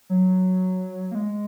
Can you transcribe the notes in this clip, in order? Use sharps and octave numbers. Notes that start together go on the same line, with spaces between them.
F#3
A#3
G#3